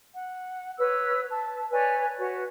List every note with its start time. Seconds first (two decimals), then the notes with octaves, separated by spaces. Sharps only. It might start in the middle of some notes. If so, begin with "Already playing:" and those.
0.14 F#5
0.78 B4 C#5 E6
1.29 A5
1.71 B4 C#5 D5 G#5
2.17 F#4 B4 C#5